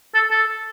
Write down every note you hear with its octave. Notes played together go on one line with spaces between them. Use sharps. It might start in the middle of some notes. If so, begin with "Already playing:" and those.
A4
A4